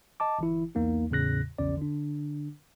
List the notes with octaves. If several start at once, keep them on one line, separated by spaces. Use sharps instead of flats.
D#5 A5 D6
G1 E3 E4
B1 E2 A#3 D#4
G#1 E2 A2 C#3 F#6 A#6
A#1 E2 C#3 C#4 D5
D3 D4